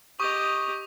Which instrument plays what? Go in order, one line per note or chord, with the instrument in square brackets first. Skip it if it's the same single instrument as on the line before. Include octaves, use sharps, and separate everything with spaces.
[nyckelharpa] G4 D#5 [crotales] C#6 D#6